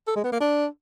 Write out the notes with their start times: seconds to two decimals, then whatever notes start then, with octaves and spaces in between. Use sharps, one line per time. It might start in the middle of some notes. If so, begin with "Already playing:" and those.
0.08 A4
0.16 G#3
0.24 B3
0.32 A#3
0.41 D4